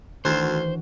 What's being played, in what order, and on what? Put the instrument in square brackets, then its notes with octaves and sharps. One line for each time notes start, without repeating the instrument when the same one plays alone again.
[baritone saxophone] D2 [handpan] D#3 D4 F#4 [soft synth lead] E3 [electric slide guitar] C5